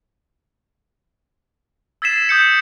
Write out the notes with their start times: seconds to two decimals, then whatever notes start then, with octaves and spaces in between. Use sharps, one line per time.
2.02 E6 G#6 A6 B6 C7 E7
2.29 D#6 G6 C#7